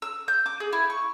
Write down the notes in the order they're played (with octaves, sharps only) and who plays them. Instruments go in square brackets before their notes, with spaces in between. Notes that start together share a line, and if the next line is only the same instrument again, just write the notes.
[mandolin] E6
G6
D6
G#4
E4
C#6